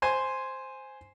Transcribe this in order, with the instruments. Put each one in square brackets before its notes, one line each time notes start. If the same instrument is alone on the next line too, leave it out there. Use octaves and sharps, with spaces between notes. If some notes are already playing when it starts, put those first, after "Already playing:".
[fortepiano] C5 G#5 C6